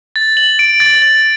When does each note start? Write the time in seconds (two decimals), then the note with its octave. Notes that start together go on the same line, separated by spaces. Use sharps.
0.16 A6
0.37 F#7
0.59 D7
0.80 A6
1.02 A6